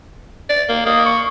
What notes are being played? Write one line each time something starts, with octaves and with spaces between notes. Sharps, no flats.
D5
A#3
A#3 D#5
C#6